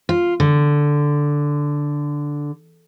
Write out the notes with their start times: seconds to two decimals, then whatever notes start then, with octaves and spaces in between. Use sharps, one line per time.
0.09 F4
0.40 D3